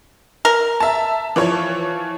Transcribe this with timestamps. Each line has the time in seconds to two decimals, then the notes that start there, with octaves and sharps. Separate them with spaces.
0.45 A#4
0.80 E5 A5
1.36 E3 F3 C#5